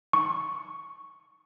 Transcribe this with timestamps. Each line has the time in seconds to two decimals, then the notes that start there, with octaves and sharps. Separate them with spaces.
0.13 C#6